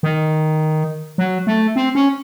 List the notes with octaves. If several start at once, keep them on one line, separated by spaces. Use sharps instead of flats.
D#3
F#3
A3
C4
C#4